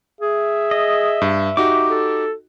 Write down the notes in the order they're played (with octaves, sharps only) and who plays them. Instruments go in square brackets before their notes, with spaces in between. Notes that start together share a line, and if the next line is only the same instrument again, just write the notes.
[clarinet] G#4 [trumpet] E5
[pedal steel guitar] D#5
[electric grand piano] G2
[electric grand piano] D#4 F#4 G4 [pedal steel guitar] D6
[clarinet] A4